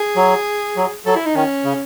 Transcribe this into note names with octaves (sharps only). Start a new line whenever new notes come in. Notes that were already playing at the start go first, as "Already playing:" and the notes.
Already playing: G#4
F#3
F#3
F#3 A4
E4
D#4
D#3 C#4
C#3